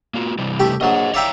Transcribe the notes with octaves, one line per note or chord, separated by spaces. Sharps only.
A#3 F4 F#4
C3 E3 G3
A3 G4
A#1 F#3 C5 D#5
C#5 D5 E5 F5 G5 A#5